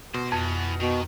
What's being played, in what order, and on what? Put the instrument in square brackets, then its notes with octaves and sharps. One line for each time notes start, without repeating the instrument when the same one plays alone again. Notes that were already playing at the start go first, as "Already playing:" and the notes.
[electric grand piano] B2 [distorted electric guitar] C5
[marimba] F2 [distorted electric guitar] E3 B3
[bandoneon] B2 [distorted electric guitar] D#3